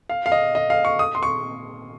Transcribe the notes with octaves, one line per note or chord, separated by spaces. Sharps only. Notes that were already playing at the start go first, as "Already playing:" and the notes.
F5
F5
D#5
D#5
F5
C#6
D#6
C6
C#6